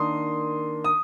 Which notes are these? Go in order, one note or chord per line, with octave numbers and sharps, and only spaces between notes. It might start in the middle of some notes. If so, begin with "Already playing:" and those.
Already playing: D#3 A#3 D4 C6 D#6
D#6